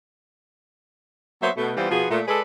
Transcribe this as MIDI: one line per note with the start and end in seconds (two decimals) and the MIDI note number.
1.43 1.52 54
1.43 1.52 58
1.43 1.52 59
1.43 1.52 72
1.43 1.52 73
1.43 1.52 76
1.57 1.73 47
1.57 1.73 57
1.77 1.91 52
1.77 1.91 55
1.77 1.91 59
1.77 1.91 60
1.77 1.91 65
1.91 2.07 47
1.91 2.07 53
1.91 2.07 59
1.91 2.07 65
1.91 2.07 66
1.91 2.07 68
2.11 2.22 46
2.11 2.22 57
2.28 2.42 56
2.28 2.42 68
2.28 2.42 69
2.28 2.42 71
2.28 2.42 74